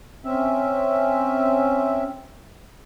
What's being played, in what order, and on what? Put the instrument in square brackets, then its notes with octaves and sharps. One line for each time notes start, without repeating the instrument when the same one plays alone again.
[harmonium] C4 C#4 E5